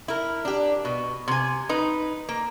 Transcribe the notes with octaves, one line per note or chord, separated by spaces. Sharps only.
E4 A#4
D4 G4
B2
C3 G#5
D#4 B4
A#3